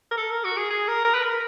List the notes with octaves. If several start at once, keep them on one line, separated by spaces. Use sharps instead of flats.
A#4
A4
A#4
F#4
G#4
G#4
A#4
A#4
B4
A#4